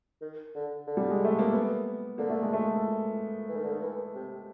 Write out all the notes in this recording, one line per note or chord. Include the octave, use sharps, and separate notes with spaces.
D#3
D3
D3
G3
G#3
A3
A#3
B3
D3 A#3
A3
G#3
A3
E3
D#3
D3
D#3
E3
C3